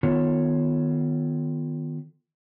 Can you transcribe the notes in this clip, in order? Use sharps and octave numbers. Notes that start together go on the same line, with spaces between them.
D#3 B3 F4 A4 C#5